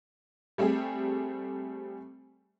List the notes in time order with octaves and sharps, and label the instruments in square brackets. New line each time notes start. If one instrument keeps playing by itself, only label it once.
[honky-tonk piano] G3 A3 C4 G4 G#4